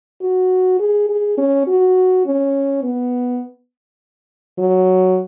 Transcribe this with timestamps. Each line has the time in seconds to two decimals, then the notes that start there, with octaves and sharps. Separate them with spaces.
0.22 F#4
0.80 G#4
1.09 G#4
1.38 C#4
1.68 F#4
2.26 C#4
2.84 B3
4.59 F#3